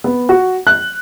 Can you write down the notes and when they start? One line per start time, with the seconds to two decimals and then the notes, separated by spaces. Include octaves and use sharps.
0.04 B3
0.29 F#4
0.67 F#6